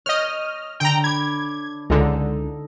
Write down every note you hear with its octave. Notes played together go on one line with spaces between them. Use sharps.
C#5 D#5 F6 G6
D#7
D3 G5 A#5
B5 D6 G#6
C#2 D3 D#4 A4